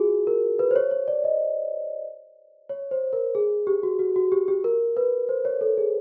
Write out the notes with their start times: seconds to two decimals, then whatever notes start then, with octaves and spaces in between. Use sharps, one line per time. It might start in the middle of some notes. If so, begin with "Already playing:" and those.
Already playing: F4 F#4 G#4
0.27 A#4
0.59 B4
0.71 C5
0.76 C#5
0.91 C#5
1.08 D5
1.24 D#5
2.69 C#5
2.91 C5
3.13 A#4
3.35 G#4
3.67 G4
3.83 F#4
3.99 F#4
4.16 F#4
4.32 G4
4.48 G4
4.64 A#4
4.97 B4
5.29 C5
5.45 C#5
5.61 A4
5.78 G#4